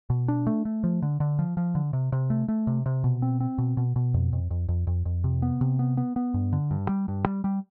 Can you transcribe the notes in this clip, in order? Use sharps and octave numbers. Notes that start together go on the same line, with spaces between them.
B2
D4
A3
A3
F3
D3
D3
F3
F3
D3
C3
C3
A3
A3
C3
C3
B2
C4
C4
B2
B2
B2
F2
F2
F2
F2
F2
F2
C3
B3
C3
B3
B3
B3
G2
D3
G2
G3
G2
G3
G3